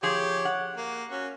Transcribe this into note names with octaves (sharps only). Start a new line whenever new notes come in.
F3 G4 G#4 C#5
F#5
A#3
C#4 F#4